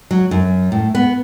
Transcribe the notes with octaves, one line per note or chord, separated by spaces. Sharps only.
F#3
F#2
A2
B3